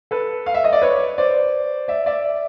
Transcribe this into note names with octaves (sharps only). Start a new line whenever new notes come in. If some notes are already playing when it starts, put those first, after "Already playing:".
A4 B4
F5
E5
D#5
D5
B4 C#5
C5 D5
D5 E5
D5 E5